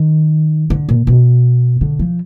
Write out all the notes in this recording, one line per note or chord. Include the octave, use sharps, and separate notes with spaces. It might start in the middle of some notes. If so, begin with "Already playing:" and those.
Already playing: D#3
D3
A#2
B2
D3
F3